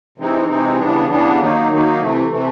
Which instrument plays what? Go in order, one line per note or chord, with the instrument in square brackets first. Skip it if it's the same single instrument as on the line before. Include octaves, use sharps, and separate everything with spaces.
[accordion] C3 E3 G#3 C4 D#4
C3 E3 G#3 C4 D#4
C#3 E3 G3 B3 D4
C#3 E3 G3 B3 D4
D#3 F#3 A#3 D#4
D#3 F#3 A#3 D#4
C3 E3 A3
C3 E3 A3